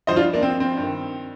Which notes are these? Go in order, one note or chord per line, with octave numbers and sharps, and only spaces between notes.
G2 F3 C5 D#5
D4 F4
A#3 D4
C4
C4
G2
D#3